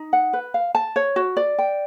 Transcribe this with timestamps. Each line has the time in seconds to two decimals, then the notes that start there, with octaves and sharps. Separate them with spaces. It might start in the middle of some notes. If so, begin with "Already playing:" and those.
Already playing: D#4
0.13 F#5
0.33 B4
0.54 F5
0.75 A5
0.96 C#5
1.16 F#4
1.37 D5
1.58 G5